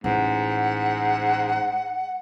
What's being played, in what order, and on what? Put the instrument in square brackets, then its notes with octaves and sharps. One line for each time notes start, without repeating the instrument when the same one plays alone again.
[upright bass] A1 [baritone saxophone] G#2 [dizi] F#5